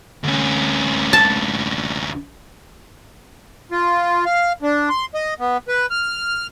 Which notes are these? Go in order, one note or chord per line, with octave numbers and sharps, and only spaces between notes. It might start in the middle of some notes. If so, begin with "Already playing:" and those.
D2 C#4
A5
F4
F5
D4
C6
D#5
B3
B4
F6